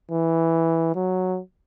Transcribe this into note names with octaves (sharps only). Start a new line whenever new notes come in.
E3
F#3